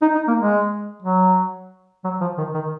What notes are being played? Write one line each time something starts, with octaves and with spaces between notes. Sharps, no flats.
D#4
D#4
A#3
G#3
F#3
F#3
F3
D#3
D#3